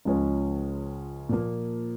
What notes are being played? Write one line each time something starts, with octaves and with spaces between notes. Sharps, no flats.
C#2 C#3 F3 G#3 C#4
A#2 F3 A#3